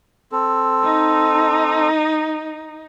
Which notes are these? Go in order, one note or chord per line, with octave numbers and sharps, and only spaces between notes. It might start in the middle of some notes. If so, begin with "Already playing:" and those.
C4 A4
D#4